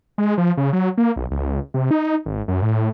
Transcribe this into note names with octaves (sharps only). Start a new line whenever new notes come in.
G#3
F3
C#3
F#3
A#3
B1
C#2
C3
D#4
G#1
F#2
A2